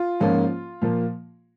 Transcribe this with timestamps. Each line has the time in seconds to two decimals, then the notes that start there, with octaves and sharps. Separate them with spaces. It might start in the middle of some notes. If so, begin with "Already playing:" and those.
Already playing: F4
0.20 G#2 F3 A#3 C#4
0.82 A#2 F3 A#3